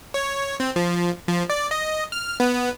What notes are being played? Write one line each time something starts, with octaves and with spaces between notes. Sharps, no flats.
C#5
C4
F3
F3
D5
D#5
F6
B3